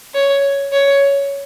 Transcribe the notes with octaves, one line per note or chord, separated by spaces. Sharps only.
C#5
C#5